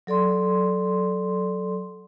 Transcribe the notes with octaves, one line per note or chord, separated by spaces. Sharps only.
F#3 A4 D5 C6